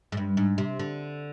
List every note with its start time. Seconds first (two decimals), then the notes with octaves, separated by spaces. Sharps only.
0.12 G#2
0.17 G2
0.37 G#2
0.58 C3
0.79 D3